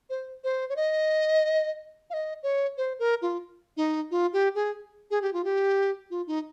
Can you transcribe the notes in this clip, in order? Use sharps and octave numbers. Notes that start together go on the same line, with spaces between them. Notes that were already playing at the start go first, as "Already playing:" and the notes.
C5
C5
C#5
D#5
F5
D#5
C#5
C5
A#4
F4
D#4
F4
G4
G#4
G#4
G4
F4
G4
F4
D#4